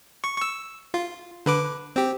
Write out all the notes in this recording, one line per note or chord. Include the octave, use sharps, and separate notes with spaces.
C#6
C#6 E6
F4
D3 B4 D6
C4 G4